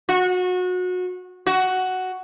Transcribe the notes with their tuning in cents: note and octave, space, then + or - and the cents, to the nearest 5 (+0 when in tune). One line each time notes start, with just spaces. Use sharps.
F#4 -25
F#4 +5